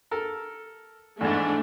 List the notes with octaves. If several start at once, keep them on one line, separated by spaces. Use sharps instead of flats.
A4 A#4
E2 G#2 A3 D4